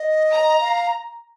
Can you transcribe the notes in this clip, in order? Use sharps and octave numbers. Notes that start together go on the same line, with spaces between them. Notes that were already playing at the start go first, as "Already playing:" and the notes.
Already playing: D#5
A#5
F5